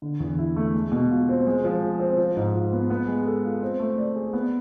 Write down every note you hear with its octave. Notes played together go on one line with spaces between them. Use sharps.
D3
E2
E4
A3
G#3
B2
F4
C4
G#3
F3
G#4
C4
F3
G#2
F4
B3
B3
G#3
A4
F4
C4
A3
D5
G#4
B3